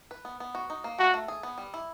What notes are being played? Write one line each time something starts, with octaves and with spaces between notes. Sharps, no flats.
B4
B3
B3
F#4
D#4
A#3
A3 F#4
A3
G#4
B3
G3
E4